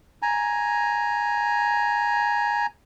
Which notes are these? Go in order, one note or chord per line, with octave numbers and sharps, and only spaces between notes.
G#5 A#5